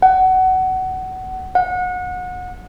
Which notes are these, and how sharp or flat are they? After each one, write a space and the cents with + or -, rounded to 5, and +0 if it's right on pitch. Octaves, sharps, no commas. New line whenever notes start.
F#5 +20
F#5 -30